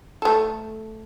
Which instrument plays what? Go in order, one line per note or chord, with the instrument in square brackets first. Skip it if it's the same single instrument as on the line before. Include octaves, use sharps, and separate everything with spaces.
[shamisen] A3 A4